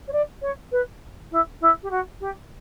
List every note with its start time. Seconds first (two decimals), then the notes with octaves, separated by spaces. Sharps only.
0.07 C#5
0.12 D5
0.41 C#5
0.71 B4
1.31 E4
1.60 E4
1.82 G4
1.90 F#4
2.20 G4